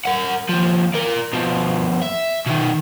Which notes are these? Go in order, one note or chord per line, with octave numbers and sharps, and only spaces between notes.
A#4 F#5
D#2 F3
A#4 D5
B2 F3
E5
B2 D#3